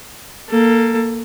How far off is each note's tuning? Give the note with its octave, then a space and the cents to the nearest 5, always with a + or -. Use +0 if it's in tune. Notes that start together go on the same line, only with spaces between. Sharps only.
A#3 +0 A4 +15